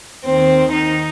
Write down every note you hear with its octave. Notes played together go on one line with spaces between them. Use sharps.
D#2 D#3 C4
D#4